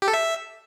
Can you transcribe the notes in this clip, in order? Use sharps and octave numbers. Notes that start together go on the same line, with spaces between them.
G4
A4
E5